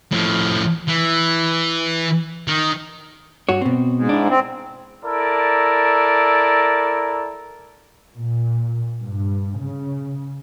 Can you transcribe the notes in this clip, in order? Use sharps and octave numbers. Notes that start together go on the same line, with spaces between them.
A2 F3
E3
D#3
G2 F#4 C#5
B2 C4
G#2
D4 E4
C4
E4 A4 A#4 D5
A#2
G2
C#3